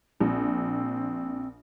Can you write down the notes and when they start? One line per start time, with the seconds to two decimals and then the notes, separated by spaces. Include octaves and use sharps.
0.21 A#1 C4